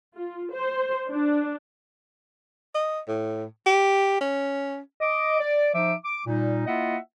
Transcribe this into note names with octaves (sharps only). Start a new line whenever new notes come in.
F4
C5
D4
D#5
A2
G4
C#4
D#5 D6
D5
F3 D#4 C5 E5 D6
D6
A#2 G3 D#4
A#3 E4 F4 D#5 E5 F#5